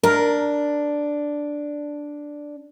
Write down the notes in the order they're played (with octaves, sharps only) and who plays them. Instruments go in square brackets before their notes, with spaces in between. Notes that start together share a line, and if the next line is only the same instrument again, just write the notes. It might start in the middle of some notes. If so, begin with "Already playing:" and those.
[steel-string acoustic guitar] D4 [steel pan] A#4